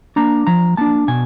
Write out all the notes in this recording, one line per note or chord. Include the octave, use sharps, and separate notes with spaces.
A#3 D4 A#5
F3 A#5
A#3 D4 A5
B2 G#5